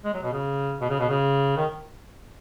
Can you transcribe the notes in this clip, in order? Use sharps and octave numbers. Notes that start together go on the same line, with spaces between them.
G#3
F#3
B2
C#3
B2
C#3
B2
C#3
D#3